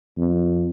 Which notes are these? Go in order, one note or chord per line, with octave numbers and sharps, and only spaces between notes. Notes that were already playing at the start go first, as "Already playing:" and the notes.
F2